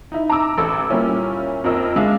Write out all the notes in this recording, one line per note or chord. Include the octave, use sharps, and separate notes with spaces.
D#4 E4
A#5 D6 E6
A1 A4 E6
A#2 G3 A#3 C#4 E4
F2 A#4 D#5 E6
G#3 D4 E5 F5 E6